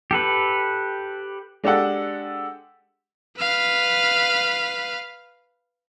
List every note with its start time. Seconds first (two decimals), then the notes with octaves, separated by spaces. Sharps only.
0.11 G4 A4 B4
1.64 G#3 D4 G4 A4 F#5
3.39 B4 F5